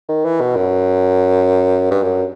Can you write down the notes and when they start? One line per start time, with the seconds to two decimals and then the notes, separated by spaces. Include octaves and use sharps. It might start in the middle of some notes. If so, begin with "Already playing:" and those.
0.09 D#3
0.25 E3
0.41 B2
0.56 F#2
1.91 G2
2.02 F#2